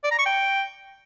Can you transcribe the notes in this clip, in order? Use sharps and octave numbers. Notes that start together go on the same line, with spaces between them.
D5
A#5
C#6
G5